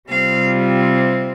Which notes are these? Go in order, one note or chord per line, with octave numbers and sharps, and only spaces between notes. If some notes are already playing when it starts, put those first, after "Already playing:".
C3 G3 C4 F4 F5